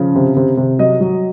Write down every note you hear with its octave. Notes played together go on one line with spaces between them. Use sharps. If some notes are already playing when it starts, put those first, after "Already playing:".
Already playing: C#3 F3
C3
C3
C3
F#3 D#5
F#3